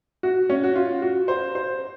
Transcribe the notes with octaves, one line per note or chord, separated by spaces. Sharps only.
F#4
C#4
F#4
F4
F#4
C5
C5